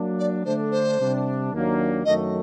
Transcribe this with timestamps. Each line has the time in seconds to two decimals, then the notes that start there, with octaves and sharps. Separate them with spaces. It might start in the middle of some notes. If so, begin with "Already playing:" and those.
Already playing: F#3 A#3 D4
0.18 D5
0.45 D3 A3 D4 C5
0.71 C5
0.99 C3 G3 D4
1.52 D#2 D#3 F#3 A#3 D4
2.05 F#2 D#3 F#3 A3 D#5